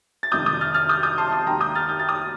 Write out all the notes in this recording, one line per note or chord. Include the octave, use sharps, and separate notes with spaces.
A6
G1 F2 C3 D#3 D#6 G6
D#6 G6
F6 A6
F6 A6
D#6 G6
D#6 G6
A5 C6
A5 C6
D#2 D#3 G5 A#5
D#6 G6
F6 A6
G6
A6
D#6 G6